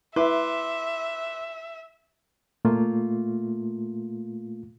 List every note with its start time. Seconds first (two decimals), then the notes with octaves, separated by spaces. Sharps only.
0.16 E4 B4 E5 C6 D6
2.65 A#2 A3 A#3 F4